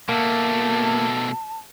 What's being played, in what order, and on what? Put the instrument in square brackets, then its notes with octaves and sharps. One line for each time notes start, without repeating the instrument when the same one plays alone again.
[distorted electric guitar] B2 A3 [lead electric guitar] A#3 [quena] A5